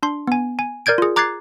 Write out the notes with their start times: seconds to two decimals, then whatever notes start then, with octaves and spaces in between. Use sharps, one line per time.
0.03 D4 C6
0.27 B3 G#5
0.59 G#5
0.86 A#4 D5 G6 G#6 D7
0.98 F4 G#4
1.16 A#5 D6 F#6 G#6 A6 C7